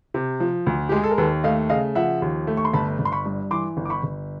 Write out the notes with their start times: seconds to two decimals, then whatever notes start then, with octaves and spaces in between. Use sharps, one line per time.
0.14 C3
0.40 F3
0.66 D2
0.89 G4
0.92 G#3 G#4
1.04 A4
1.11 A#4
1.18 D#2 A4 B4
1.44 A3 D#5 F5
1.69 C#3 D#5 F5
1.95 F3 E5 F#5
2.22 D#2
2.47 A3
2.57 C#6
2.65 C6
2.73 G1 A5 B5
2.99 G1
3.05 C6
3.12 B5 C#6
3.25 G2
3.51 E3 C6 D6
3.77 G1
3.86 D6
3.90 B5 C#6
4.03 G1